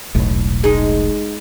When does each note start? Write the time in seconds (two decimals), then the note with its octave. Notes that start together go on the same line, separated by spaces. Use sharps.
0.15 E1 B1 A2
0.64 G#3 D#4